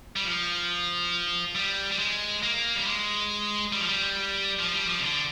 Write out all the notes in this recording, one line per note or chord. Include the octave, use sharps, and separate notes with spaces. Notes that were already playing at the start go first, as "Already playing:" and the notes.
G3
F3
G3
G3
G#3
A#3
G3
G#3
G3
F3
G3
F3
G3
F3
C3
D3